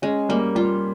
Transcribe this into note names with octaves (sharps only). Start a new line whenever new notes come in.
G#3 C#4
G3 A#3
G3 F4